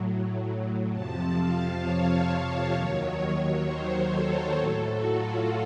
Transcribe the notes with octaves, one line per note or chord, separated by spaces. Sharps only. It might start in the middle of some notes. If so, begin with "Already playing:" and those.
Already playing: A2 F#3
F2 C3 F3 A5
F5
C#5
D#2 D#3 F#3
C5
A4
A2 F#3 A4
F#4
F4